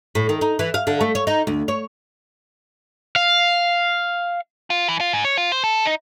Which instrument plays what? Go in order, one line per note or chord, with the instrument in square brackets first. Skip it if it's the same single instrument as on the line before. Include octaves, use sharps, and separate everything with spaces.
[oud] A2
D#3
D#4
E3
F5
D3
A3
C#5
D#4
D2
C#5
[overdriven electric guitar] F5
[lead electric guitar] F4
E3
F4
G#2
C#5
F4
C5
A4
D#4